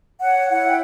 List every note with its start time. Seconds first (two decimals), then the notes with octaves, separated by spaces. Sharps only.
0.22 C#5 F#5
0.49 E4 F#5
0.68 G5